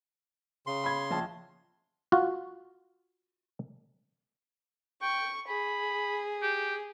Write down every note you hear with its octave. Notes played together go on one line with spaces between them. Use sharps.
C#3 C6
B5 G#6
A#1 A5
F4 F#4
G5 C#6
G#4 B5
G4